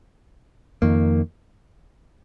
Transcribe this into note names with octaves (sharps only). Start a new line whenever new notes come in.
F2 D#3 A#3